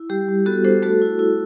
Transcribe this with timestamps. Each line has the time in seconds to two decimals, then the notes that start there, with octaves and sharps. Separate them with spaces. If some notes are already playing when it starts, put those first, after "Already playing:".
Already playing: E4
0.10 G3 G4
0.28 G3
0.46 B3 F#4 A4
0.64 D4 A4 C5
0.82 A3 F#4 A4
1.02 E4
1.19 E4